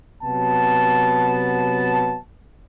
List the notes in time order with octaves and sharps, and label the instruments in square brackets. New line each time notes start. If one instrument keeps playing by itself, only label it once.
[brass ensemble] C3 F#3 B3 A5